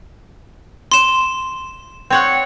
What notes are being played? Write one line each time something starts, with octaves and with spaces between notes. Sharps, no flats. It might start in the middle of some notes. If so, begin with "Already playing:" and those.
C6 E7
C4 C#5 F#5